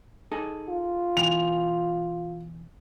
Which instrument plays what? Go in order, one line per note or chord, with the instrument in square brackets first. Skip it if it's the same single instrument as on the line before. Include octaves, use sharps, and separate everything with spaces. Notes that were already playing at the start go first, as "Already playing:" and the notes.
[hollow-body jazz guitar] D#4 G#4 A4
[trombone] F4
[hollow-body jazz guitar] B2 E3 [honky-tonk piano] F7